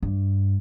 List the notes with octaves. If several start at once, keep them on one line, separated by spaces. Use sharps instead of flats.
G2